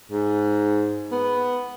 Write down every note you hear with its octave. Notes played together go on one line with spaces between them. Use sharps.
G#2
B3